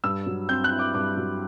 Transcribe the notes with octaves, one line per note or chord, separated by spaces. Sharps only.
G2 E6
F#3
C4 G6
F#6
E4
D6
G2 D6
F#3